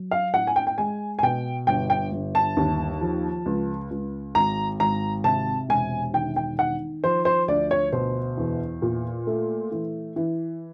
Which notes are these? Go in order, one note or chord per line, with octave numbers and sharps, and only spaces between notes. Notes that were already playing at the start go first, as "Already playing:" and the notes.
Already playing: F#3
F5
A2 F#5
G#5
G5
G5
G#3 G#5
G#5
B2 G5
G1 G5
G5
G1
A5
D#2
F3
C#2
C#2
G#1 A#5
G#1 A#5
C3 A5
E1 G#5
D#3 G5
G5
D#3 F#5
F3 C5
C5
D2 D5
C#5
B2 C5
E2
A#2
A3
E3
E3